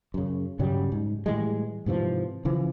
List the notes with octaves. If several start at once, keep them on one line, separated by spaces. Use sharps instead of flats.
F#2 C#3
G2 C#3 F#3 G3
G#2
A2 E3 G3 G#3
G#2 C3 E3 F3
C#3 E3 F3